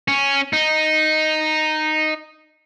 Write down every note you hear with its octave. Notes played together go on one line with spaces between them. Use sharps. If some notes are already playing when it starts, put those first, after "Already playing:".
C#4
D#4